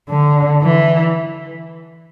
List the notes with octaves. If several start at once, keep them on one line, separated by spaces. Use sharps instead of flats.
D3
E3